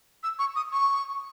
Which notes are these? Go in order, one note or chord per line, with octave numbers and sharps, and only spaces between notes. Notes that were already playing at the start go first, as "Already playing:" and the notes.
E6
C#6
D#6
C#6